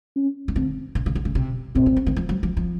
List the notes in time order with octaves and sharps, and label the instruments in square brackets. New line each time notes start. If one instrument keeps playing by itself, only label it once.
[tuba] C#4
[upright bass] D#3
[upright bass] D3 [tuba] C4
[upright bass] C#3
C#3
D3
C#3
C3
[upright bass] B2 [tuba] C4
[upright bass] A#2
C#3
D#3
F3
F#3
F3
F3